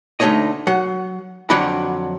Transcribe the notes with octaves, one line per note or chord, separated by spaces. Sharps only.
D2 A3 D#4 C#5 D#5
F#3 F#5
F2 D3 F#3 F#4 D5 B5